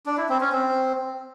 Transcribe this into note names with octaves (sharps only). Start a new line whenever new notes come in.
D4
E4
C4
C#4
C4